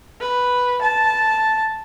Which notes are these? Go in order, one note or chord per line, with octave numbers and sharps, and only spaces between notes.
B4
A5